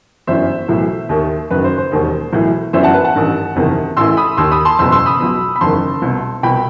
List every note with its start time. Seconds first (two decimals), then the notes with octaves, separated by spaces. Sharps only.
0.27 G1 F#2 E3 C5 E5
0.68 B1 A2 E3
1.09 D#2 D#3
1.50 F#1 F#2 D#3 B4
1.64 C5
1.78 C5
1.92 E1 D#2 D#3
2.33 B1 A2 E3
2.73 G1 F#2 E3 C5 E5
2.83 F#5 A5
2.94 B4
3.04 F#5 A5
3.15 A1 G2 D#3
3.56 F#1 E2 C3 D#3
3.97 A1 A2 E3 C6 E6
4.17 B5 D#6
4.37 D#2 D#3 C6 E6
4.51 B5 D#6
4.65 A5 C6
4.79 F#1 E2 B2 C6 E6
4.92 C6 E6
5.06 B5 D#6
5.20 B1 B2
5.56 B5
5.61 F#1 E2 D#3 A5 C6
6.02 C2 B2
6.43 C2 B2 G5 B5